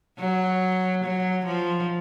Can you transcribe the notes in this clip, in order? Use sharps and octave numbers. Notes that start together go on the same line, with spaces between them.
F#3
F#3
F3